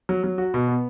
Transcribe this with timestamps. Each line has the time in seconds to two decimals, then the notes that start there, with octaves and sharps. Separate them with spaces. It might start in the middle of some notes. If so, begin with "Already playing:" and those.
0.09 F#3
0.24 F#3
0.38 F#4
0.54 B2
0.68 B3